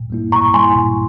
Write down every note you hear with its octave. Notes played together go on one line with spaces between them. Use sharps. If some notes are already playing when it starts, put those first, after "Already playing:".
Already playing: A#2
G3 A#3 E4
A#2 A#5 C#6
G3 A#3 E4 G#5 C6
A#2